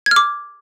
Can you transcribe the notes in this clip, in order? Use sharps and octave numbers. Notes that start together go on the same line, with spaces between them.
G#6
F6
D6